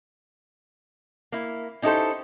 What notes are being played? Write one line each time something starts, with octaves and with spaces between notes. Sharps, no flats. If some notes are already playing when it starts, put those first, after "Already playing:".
A#3 E4
C#4 D#4 E4 G4 A4 C5